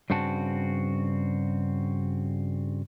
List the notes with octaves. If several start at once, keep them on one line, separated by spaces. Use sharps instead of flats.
G2 C#3 C4 F#4 A5